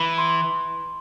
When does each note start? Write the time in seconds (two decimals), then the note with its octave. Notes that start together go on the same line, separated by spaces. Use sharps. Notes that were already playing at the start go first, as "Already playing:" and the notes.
Already playing: E3 B5
0.18 C6